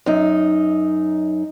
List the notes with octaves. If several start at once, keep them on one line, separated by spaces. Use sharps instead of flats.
F#2 D#4